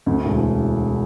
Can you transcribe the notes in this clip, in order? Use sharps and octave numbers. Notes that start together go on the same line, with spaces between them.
D2
E1